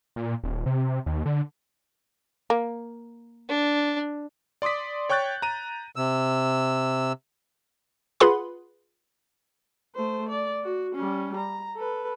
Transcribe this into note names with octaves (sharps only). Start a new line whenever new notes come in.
A#2
D#1
C3
D#2
D3
A#3
D4
D5 C6 D6 D#6 B6
C#5 G5 C#6 F#6 G6 A6
A#5 D#7
C3 E6
F4 G#4 B4 F#5 B5 C6
A3 C5
D5
F#4
G3 C#4
A#5
A4 B4